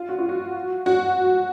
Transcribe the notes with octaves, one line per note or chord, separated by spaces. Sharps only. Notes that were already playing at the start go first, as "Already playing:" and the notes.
Already playing: F4
F#4
F4
F#4
F#4